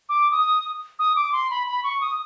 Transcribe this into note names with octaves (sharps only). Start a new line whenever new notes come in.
D6
D#6
D#6
D6
C6
B5
B5
C#6
D#6